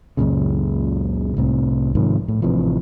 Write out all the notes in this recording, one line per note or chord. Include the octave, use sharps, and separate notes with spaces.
C#2 F#2 A#2 C#3
C2 A2 C3
G#2 C3 D#3 F3
A2
A1 C3 E3 F3